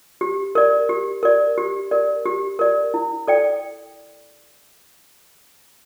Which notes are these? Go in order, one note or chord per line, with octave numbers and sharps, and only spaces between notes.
G4
A#4 D5
G4
A#4 D5
G4
A#4 D5
G4
A#4 D5
E4
A4 D5 G5